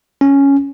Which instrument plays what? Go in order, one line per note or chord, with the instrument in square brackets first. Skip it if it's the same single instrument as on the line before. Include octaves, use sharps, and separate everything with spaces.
[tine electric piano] C#4